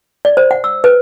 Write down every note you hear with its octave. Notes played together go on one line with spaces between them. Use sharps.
D5
C5
F#5
E6
B4